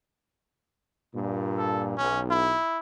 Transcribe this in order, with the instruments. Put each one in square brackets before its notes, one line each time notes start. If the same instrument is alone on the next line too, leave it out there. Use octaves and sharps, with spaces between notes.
[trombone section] G2 A#2
[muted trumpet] A4
[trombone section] B1 [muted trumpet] C#4
[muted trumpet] E4